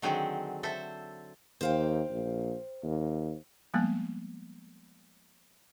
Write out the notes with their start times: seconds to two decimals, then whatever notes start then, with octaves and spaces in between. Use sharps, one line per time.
0.02 D3 D#3 F#3 C4 G#4
0.63 A4 C5 E5
1.61 D#2 C5 F5 G5
2.10 A#1
2.83 D#2
3.74 F3 G3 G#3 A#3 B3